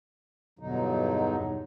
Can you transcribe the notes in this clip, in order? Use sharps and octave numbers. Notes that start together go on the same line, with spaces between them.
E2 G2 B2 D3 F#3 D#4